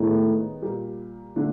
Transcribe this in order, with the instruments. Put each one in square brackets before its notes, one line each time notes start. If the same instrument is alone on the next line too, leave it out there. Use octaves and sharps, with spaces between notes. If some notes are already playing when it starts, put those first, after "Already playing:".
Already playing: [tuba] A2 [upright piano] D#3 G#3 B3 D#4
[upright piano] A#2 G3 A#3
D3 F3 A3 D4 F4